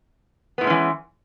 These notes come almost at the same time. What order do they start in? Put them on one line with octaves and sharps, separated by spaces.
B3 A2 G#3 C#4 E3